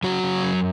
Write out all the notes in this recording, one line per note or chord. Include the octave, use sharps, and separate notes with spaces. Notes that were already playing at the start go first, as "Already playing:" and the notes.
C#3 F#3 F#4
C#3
F#2